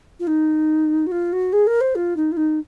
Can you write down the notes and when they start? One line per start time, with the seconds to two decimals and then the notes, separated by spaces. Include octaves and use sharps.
0.20 F4
0.27 D#4
1.07 F#4
1.12 F4
1.33 F#4
1.53 G#4
1.67 A#4
1.81 C5
1.95 F4
2.17 D#4
2.32 F4
2.37 D#4